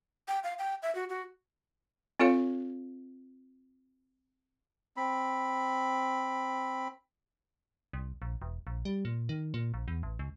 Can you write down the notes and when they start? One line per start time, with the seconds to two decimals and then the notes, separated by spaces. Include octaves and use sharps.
0.28 G5
0.44 F5
0.59 G5
0.83 E5
0.95 F#4
1.09 F#4
2.19 C4 F4 A4 C#5 F5
4.97 C4 B5
7.93 C2
8.22 A#1
8.42 E1
8.67 A#1
8.85 G3
9.05 A#2
9.29 D#3
9.54 A#2
9.74 A#1
9.88 E2
10.03 A1
10.19 C#2